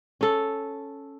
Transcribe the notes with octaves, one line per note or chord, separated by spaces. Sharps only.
C#4 A4